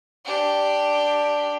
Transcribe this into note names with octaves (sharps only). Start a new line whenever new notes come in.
D4 G4